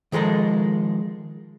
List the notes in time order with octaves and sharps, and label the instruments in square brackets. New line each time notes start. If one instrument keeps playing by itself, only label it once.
[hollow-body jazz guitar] D#3 F3 G#3 A4 A#4